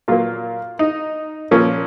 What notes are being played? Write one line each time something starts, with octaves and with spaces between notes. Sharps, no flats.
A#2 F#3 A#3 F4
D#4
A#2 F3 A#3 C#4